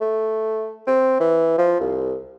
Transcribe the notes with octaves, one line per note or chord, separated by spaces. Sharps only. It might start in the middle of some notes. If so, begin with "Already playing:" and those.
A3
C4
E3
F3
C2